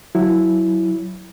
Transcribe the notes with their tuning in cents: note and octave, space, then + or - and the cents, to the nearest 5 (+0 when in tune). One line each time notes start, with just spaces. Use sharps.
F#3 +5 E4 +0